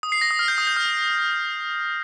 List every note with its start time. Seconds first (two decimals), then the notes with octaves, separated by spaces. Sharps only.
0.03 D#6
0.12 C7
0.21 A#6
0.31 D#6
0.39 F6
0.48 G6
0.58 D#6
0.67 G6
0.77 F6